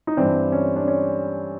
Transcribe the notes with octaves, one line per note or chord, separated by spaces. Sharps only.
D#4
G2 E3 C4 D4
C#4
D4
C#4